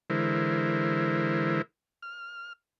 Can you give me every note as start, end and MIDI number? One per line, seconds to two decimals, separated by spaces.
0.10 1.62 50
0.10 1.62 52
0.10 1.62 56
0.10 1.62 64
0.10 1.62 70
0.10 1.62 72
2.02 2.53 89